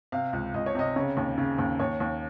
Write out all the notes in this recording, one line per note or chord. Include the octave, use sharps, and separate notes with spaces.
C3 F5
C#2
C#2 D#5
C#5
C3 D#5
C#3 C#5
D#2
C#3
D#2
D#2 C#5
D#2